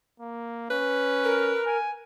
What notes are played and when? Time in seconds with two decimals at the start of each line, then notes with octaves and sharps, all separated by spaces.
0.20 A#3
0.70 C#4 B4
1.24 A#4
1.66 G#5